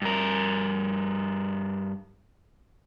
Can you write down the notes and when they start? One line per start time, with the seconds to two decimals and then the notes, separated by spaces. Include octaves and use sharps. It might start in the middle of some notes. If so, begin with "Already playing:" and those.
0.02 G2 A#4